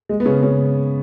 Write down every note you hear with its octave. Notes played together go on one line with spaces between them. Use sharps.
G#3
B3
C#3 C#4
C#3 C#4